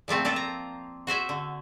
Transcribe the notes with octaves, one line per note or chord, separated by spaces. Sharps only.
A#2 F3 A3 C4
A#3 D4 F4 A4
A#5
F#4 C5 E5 G#5
D3